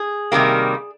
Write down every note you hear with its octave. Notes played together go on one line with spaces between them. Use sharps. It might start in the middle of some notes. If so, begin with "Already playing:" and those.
Already playing: G#4
C3 D#3 G3 A#3